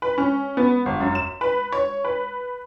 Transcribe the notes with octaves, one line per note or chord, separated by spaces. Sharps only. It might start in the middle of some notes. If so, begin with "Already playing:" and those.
B4
C#4
B3
G1
F#2
E7
B4
C#5
B4